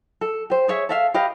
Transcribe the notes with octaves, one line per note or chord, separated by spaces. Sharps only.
A4
G4 C5
G#4 C#5 E5
A4 E5 F5
G4 B4 D#5 F5